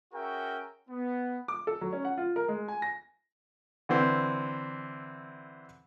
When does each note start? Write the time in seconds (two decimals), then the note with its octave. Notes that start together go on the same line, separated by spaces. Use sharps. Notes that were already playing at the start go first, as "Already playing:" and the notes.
0.13 C#4 F#4 G#4 A#4 E5 G5
0.89 B3
1.48 D6
1.67 A4
1.81 F#3
1.93 C#4
2.05 F#5
2.18 F4
2.36 A#4
2.48 G#3
2.68 G#5
2.82 A#6
3.89 D3 E3 C4